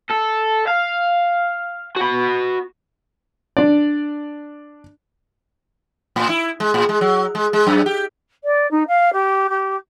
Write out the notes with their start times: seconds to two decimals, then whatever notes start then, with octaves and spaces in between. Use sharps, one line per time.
0.10 A4
0.68 F5
1.97 F#4 B5
3.57 D4 D5
6.16 A2
6.29 E4
6.60 G#3
6.74 A2
6.89 G#3
7.01 F#3
7.35 G#3
7.53 G#3
7.67 F#2
7.86 G4
8.44 D5
8.71 D#4
8.88 F5
9.13 G4
9.50 G4